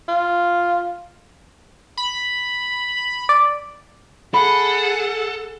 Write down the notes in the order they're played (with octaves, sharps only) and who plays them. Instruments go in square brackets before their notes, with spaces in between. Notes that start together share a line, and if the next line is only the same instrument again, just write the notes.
[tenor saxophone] F4
[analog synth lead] B5
[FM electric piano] D5
[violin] G#4 F#5 [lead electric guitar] A4 [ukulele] B5